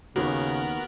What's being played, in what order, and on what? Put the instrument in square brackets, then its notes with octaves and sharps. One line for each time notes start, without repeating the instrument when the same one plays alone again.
[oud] D#2 [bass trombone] C#3 [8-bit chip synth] B3 A#4 F#6 [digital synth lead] F#4